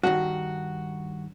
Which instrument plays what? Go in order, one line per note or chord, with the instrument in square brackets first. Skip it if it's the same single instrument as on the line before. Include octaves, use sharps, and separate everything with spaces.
[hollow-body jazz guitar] G2 D#3 [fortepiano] F#4